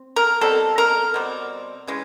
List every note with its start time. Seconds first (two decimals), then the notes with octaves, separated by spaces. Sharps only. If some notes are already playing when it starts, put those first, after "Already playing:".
Already playing: C4
0.16 A#4
0.41 B2 G3 C4 A4
0.78 A#4
1.14 B2 G3 C4
1.87 C#3 E3 G#3